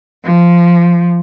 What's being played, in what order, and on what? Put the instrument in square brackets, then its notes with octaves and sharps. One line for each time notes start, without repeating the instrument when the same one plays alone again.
[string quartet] F3